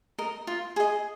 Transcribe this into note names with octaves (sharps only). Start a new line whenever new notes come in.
A#4 D#5
F4
G#4 D#5